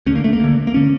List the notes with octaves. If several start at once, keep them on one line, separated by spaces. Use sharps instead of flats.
D2 D3 A#3 C#4
A3
A#3
D2 D3
A#3
D3 C#4